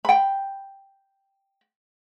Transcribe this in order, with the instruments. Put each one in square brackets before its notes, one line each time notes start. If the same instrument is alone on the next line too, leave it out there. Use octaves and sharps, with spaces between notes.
[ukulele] G5 B5